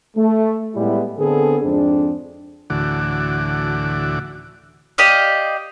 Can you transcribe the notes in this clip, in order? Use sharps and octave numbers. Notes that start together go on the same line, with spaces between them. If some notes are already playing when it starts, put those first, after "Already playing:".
A3
A2 G3 G#3 B3 E4
D3 B3 C4 D4 G#4 A4
F2 G#2 C4 D4
D2 A2 D3 E3 F#4 D6
G4 D5 D#5 F5